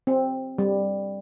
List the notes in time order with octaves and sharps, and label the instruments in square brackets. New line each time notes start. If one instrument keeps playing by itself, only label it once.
[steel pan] C4
G3